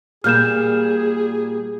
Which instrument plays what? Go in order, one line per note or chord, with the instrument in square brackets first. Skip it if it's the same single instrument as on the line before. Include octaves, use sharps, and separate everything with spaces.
[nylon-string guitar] A#2 G3 A#3 [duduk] G#4 [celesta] F6 G6 E7